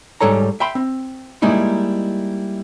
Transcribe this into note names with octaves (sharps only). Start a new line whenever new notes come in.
G#2 G3 A4 C#5 A#5
E5 G5 B5 C6
C4
G3 G#3 A#3 D#4 E4